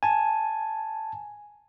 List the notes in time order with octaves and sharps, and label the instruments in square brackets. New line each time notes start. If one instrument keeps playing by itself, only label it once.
[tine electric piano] G#5 A5